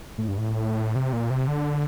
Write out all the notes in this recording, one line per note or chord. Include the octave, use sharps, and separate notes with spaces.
A2
G2
A2
C3
A#2
C3
D3